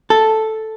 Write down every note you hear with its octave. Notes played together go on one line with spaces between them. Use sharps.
A4